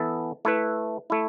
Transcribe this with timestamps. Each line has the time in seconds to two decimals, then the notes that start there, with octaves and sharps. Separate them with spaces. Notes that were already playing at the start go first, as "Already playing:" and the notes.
Already playing: E3 B3 A4
0.45 A3 E4 B4
1.10 A3 E4